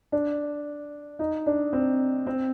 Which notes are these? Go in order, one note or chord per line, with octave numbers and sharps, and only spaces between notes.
D4
D#4
D4
C4
C4